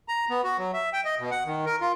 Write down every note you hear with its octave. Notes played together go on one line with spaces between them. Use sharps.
A#5
B3
F#4
F#3
E5
G5
D#5
B2
F#5
D#3
A#4
F4